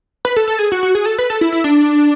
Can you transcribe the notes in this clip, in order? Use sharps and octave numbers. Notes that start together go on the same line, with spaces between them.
B4
A4
A4
G#4
F#4
F#4
G#4
A4
B4
A4
E4
E4
D4